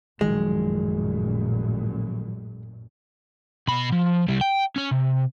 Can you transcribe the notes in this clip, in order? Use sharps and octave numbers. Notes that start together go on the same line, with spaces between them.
A1 F#2 A#2 D#3 F3 F#3 G#3
B2 B5
F3
C2 G3
G5
C#4 C#5
C3